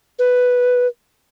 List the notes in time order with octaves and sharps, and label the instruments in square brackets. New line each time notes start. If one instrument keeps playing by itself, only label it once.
[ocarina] B4